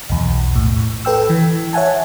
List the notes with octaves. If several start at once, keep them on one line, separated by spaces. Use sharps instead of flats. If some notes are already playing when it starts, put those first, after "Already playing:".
B1 E2
A2
A4 B4 G5 E6
E3
C#5 E5 F#5 G#5 A5